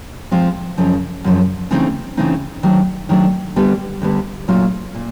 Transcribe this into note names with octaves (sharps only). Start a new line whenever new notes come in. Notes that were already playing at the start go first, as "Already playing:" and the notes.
F3 G#3 C4 F4
F#2 C#3 F3
F#2 C#3 F3
C#3 E3 A3 C4 D#4
C#3 E3 A3 C4 D#4
D#3 F#3 A3 D4
D#3 F#3 A3 D4
D2 D3 G3 B3
D2 D3 G3 B3
A#2 F#3 A3 C#4 F4
A#2